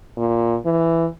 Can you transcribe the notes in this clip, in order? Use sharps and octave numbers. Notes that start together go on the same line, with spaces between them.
A#2
E3